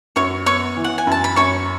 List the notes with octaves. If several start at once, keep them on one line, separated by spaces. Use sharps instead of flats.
F#2 C#5 C#6
B3 C#5 C#6
E3
F#5
G#5
F#2 A5
B5
F#2 C#5 C#6